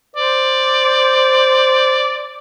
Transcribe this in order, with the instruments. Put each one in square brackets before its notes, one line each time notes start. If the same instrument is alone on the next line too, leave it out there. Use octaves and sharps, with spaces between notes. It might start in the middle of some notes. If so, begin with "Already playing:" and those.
[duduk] C5 [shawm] D5